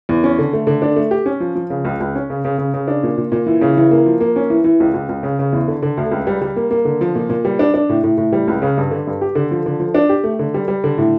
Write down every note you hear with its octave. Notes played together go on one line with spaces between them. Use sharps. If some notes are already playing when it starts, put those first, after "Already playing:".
E2
C#4
D3
A3
D3
D4
A3
G4
C#4
F3
F3
C#3
C#2
C#2
C#4
C#3
C#3
C#3
C#3
D4
A#2
A#2
A#2
E3
C#3
E3
A#3
F3
A#3
C#4
E3
E3
C#2
C#2
C#2
C#3
C#3
E2
D3
D3
D2
C#2
G3
G3
A#3
A#3
D3
F3
A#2
A#2
G3
D4
D4
A2
A2
A2
G3
C#2
C#3
G2
D3
G2
G4
D3
F3
D3
F3
D4
G4
A3
D3
G3
G3
D3
A2